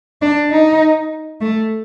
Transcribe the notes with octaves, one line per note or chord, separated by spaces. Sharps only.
D4
D#4
A3